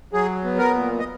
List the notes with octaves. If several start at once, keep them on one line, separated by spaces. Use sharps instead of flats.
F#3 G#4
B3
A#4
A#2
D#5